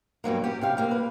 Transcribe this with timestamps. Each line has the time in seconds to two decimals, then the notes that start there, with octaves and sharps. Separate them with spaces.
0.24 G2 B2 F#3 A#3
0.44 C#4 G4
0.61 C3 G4 F5
0.77 A2 A#3 F5
0.91 B4